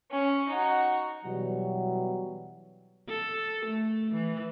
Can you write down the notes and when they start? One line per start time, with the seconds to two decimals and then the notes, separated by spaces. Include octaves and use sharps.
0.11 C#4
0.48 D#4 F#4
1.25 B2 E3 F#3 G3
3.09 A4
3.66 A3
4.11 E3